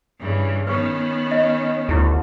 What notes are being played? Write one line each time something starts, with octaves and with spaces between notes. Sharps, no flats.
G2 C#3 E3
D#3 B3 C#4 B4 C#6
D#5
D2 E4 G4